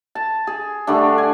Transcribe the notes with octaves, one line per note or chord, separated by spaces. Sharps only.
A5
G#4
D3 G3 A3 D4
G#5